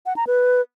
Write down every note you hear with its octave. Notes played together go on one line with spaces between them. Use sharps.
F#5
A#5
B4